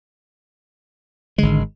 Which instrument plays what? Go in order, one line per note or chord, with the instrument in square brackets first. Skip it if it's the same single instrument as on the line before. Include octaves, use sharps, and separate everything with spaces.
[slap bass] G#1 G#3 [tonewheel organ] D3